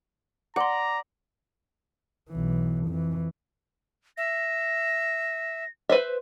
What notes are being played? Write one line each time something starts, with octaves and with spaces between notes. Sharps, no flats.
D5 F#5 A#5 C6
B1 E3
F2 E3
E5 A#6
B4 C5 E5